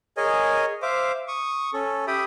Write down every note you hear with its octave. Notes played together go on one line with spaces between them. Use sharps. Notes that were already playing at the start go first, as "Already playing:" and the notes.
G#4 A#4 C#5 D#5 G#5
C5 E5 F5 D6
C#6 D#6
C#4 A4
G4 E5 G5 B5 D#6